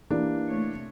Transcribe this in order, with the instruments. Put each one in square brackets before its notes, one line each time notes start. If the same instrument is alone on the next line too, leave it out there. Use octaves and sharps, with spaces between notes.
[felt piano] E3 A#3 G4 [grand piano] D4
[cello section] C3 A3 C#5